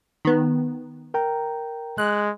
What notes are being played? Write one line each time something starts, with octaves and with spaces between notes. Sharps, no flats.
D#3 B3
A#4 G5 A#5
G#3 F#6